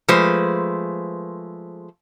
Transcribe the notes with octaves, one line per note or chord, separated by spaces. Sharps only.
F3 G#3 A3 B4 C5